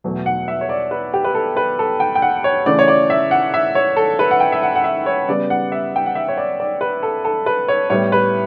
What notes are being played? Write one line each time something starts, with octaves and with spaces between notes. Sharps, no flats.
E2 B2 F#3 A3
F#5
E5
C#5
D5
B4
G4
B4
A4
B4
A4
G5
G5
F#5
C#5
C#3 E3 A3 D5
C#5
D5
E5
F#5
E5
C#5
A4
B4
F#5
G5
E5
F#5
F#5
E5
C#5
C#3 G3 B3 D5
F#5
E5
G5
F#5
E5
C#5
D5
D5
B4
A4
A4
B4
C#5
A2 G3 B3 C#5
B4